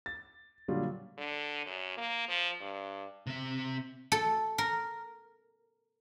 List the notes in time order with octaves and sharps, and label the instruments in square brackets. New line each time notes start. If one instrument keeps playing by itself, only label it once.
[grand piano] A6
A#2 D3 F#3 G3 F4
[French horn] D3
F#2
A#3
F3
G2
[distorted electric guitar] C3 E5
[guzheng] A4
A#4